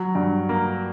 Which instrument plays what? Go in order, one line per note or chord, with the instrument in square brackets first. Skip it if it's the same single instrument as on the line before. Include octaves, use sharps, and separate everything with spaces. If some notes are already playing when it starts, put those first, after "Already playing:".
Already playing: [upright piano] F#3
G2
A#3